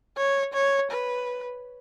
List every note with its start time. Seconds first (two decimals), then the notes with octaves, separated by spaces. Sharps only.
0.17 C#5
0.54 C#5
0.91 B4